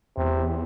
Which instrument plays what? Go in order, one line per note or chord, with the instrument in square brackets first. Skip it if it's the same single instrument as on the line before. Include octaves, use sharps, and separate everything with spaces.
[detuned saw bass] E2 [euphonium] C3